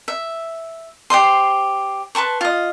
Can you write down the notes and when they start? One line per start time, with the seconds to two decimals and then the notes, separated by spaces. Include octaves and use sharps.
0.08 E5
1.10 G4 C5 D#5 C6
2.15 B4 A5 C6 C#6
2.41 F4 D#5